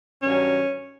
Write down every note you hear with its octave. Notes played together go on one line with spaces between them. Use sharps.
G2 D#3 F#3 C#4